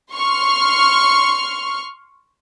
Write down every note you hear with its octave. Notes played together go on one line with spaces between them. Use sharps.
C6 C#6 F6